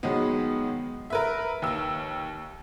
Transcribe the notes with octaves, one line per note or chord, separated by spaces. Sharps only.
D#3 F#3 G#3 B3
A#4 B4 E5
D#2 E6